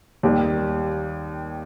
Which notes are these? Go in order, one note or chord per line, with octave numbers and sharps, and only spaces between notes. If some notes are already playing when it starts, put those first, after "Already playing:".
D#2 D#3 G3 G4